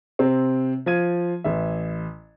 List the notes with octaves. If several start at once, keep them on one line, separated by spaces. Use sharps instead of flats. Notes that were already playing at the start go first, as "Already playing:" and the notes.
C3 C4
F3 F4 G#6 D#7
A1 E5